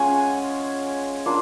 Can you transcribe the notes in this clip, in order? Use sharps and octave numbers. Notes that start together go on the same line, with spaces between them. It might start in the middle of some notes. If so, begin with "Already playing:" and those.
Already playing: G#3 C#4 F4 F#5 G#5
A#3 D4 F4